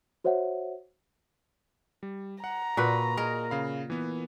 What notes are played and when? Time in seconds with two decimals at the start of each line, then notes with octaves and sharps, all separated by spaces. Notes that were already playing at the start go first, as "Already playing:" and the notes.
0.24 F#4 C5 C#5 E5 F#5
2.03 G3
2.44 F#5 A#5
2.77 A#2 F#4 B4
3.17 G#4 A#4 D#5
3.50 C#3 F5 B5
3.90 E3 B3